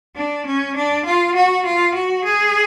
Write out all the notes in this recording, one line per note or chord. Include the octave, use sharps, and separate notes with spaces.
D4
C#4
D4
F4
F#4
F4
F#4
G#4